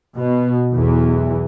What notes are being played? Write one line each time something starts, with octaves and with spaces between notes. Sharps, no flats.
B2
B1 E2 E3